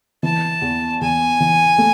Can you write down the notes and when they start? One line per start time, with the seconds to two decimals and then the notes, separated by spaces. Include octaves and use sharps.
0.23 E3 A5
0.62 E2
1.01 E2 G#5
1.40 E3
1.78 A3